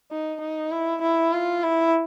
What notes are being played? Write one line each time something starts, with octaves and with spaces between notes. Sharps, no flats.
D#4
D#4
E4
E4
F4
E4